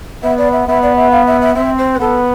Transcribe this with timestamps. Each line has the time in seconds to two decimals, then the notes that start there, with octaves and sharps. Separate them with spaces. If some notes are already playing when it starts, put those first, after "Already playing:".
0.23 B3 E5
0.38 D5
0.52 E5
0.67 B3 E5
0.82 D5
0.96 E5
1.11 F5
1.27 E5
1.41 E5
1.55 C4 E5
1.77 C5
1.95 B4
1.99 B3 A4